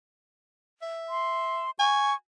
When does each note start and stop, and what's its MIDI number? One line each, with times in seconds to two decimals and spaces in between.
0.82 1.64 76
1.09 1.71 84
1.79 2.13 80
1.79 2.14 85